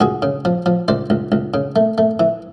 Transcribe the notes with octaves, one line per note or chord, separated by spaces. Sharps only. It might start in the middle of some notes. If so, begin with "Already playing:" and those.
C#2 F#4 G#4
C#3
F3
F3
C#2 C5 D5
C#2
C#2
C#3
A3
A3
E3